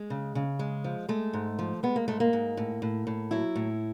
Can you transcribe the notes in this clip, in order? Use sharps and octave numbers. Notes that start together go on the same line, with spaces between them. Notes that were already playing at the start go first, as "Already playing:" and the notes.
Already playing: G#3
C#3
C#3
G#3
F3
G#3 A3
G#2
F3
G#3 B3
A#3
G#2 A3
A#3
G#2
A2
A2
A2
F#3 E4
A2